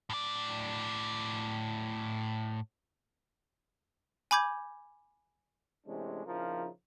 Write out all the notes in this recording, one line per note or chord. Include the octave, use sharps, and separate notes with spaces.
A2 D5
G#5 B5 D6 G6 G#6
C3 E3 G#3 A3 C#4 D4
A#1 C#3 F3 D#4 E4 A#4